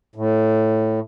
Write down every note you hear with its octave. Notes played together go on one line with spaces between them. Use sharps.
A2